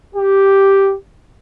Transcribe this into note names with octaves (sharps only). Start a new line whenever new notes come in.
G4